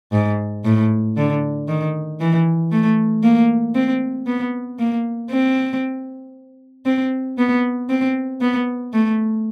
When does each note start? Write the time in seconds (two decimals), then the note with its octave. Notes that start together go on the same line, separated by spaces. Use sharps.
0.13 G#2
0.65 A2
1.17 D3
1.68 D#3
2.20 E3
2.71 A3
3.23 A#3
3.75 C4
4.27 B3
4.79 A#3
5.30 C4
6.86 C4
7.38 B3
7.89 C4
8.41 B3
8.93 A3